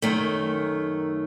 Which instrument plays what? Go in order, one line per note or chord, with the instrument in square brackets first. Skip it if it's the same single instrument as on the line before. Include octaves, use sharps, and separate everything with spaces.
[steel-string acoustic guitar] F#2 D#3 A3